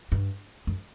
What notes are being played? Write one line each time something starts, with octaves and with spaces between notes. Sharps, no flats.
G2
F#2